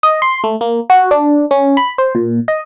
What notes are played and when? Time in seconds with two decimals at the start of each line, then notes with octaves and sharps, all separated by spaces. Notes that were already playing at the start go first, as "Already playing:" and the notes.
0.03 D#5
0.22 C6
0.44 A3
0.61 A#3
0.90 F#4
1.11 D4
1.51 C#4
1.77 B5
1.98 C5
2.15 A#2
2.48 D#5